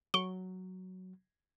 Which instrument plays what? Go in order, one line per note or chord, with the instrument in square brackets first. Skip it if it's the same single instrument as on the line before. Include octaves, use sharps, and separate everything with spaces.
[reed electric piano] F#3 [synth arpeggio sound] C#6 D7 [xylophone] G7